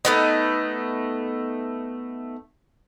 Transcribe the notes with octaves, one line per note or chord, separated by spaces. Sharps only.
A3 B3 D#4